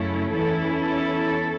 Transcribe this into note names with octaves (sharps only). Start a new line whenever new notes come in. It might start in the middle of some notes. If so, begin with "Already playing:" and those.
Already playing: F#2 C#3 A3 C#4 E4
E2 E3 C#4 E4 A4
A4